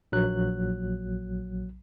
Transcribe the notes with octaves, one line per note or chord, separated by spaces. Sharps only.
A#1 F#3 F#6